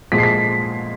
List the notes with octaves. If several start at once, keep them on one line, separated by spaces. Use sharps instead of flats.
A#2 F3 G#3 B6
C7
B6